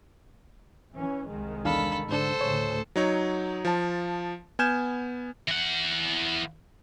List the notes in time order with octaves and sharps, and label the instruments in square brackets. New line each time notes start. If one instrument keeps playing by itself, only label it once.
[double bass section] E3 C#4
C2 D#3 G#3
[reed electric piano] E2 D4 F5 [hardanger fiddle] A4 B5
[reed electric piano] G#2 D4 [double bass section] D3 [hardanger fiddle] A4 C5
[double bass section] D2 A2 C#3 [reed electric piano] C#5
[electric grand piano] F#3 D#4 C#5
F3 A5
B3 G#5 F6 G6 G#6 E7
[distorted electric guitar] E3 F#5